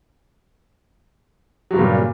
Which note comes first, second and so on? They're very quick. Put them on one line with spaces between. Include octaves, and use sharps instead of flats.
F#3 G2 C#3 A#2